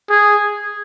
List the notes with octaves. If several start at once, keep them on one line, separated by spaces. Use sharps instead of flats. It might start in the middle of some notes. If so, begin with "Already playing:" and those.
G#4